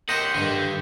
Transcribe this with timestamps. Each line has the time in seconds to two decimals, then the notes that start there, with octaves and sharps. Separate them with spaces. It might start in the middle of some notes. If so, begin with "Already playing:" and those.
0.09 G4 A#4 C5 D#5 F#5
0.35 G2 D3 D#3